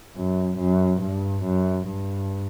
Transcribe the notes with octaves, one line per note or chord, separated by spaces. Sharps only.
F#2
F#2
G2
F#2
G2